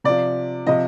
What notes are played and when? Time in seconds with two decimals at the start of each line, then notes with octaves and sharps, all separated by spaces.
0.04 C3 F3 D5
0.67 C3 F3 D#5